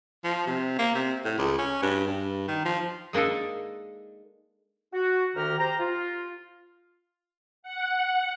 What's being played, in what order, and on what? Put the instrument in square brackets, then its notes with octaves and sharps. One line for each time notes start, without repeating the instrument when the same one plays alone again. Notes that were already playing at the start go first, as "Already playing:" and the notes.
[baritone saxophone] F3
C3
A#3
C3
A2
C#2
C#4
G2
G2
D#3
F3
[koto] G#3 A#3 D4 D#4 A4
[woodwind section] F#4
D2 D#3 G4 A#5 F6
G4 C5 A#5
F4
[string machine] F#5